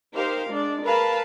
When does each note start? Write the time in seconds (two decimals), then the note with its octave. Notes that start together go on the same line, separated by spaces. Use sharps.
0.13 D#4 G4 A#4 C5 F5
0.50 G#3 D4 D5
0.84 A#4 B4 F5 A5 B5